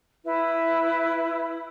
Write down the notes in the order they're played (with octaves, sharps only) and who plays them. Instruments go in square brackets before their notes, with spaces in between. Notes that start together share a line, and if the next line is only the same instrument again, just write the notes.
[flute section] E4 B4